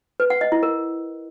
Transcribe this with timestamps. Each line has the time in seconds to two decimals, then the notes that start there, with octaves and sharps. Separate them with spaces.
0.20 B4
0.30 F#5
0.41 D#5
0.52 E4
0.63 A#4